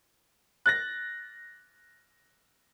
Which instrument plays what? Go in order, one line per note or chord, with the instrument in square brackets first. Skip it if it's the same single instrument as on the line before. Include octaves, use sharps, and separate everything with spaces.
[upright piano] F#6 A6 A#6